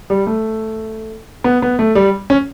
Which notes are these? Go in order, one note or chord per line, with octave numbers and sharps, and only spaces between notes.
G3
A3
B3
B3
A3
G3
C#4